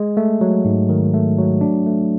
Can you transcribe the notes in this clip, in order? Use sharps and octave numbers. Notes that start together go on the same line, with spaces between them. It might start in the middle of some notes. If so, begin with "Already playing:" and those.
Already playing: G#3
A3
F#3
G#2
D#3
A3
F#3
D4
A3